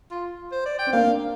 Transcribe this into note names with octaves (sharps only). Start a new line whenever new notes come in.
F4
C5
D5
G5
C4
A#3 D4 F5